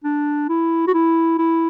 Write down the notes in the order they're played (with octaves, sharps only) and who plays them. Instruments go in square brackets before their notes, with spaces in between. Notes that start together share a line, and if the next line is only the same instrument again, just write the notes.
[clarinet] D4
E4
F#4
E4
E4